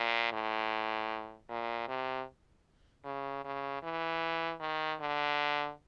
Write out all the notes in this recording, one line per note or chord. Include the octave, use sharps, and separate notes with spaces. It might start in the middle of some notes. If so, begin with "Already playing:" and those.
Already playing: A#2
A2
A#2
C3
C#3
C#3
E3
D#3
D3